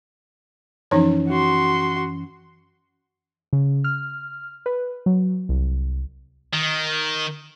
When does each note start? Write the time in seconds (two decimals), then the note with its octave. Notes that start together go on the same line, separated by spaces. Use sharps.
0.91 F#2 E3 F3 C#4 D#4 C#5
1.29 F#4 C6
3.53 C#3
3.84 F6
4.66 B4
5.06 F#3
5.49 C2
6.54 D#3